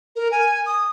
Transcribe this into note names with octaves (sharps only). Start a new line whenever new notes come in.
A#4
G#5
D#6